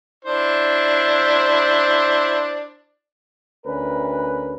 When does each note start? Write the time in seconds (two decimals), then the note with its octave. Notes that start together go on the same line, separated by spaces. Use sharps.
0.25 D4 E4 C5
3.65 D2 C#4 A#4 B4